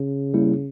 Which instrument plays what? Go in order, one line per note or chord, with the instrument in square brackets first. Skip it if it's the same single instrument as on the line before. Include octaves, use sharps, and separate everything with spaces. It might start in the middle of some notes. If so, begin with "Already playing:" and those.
Already playing: [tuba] C#3
[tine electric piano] G3 A#3 E4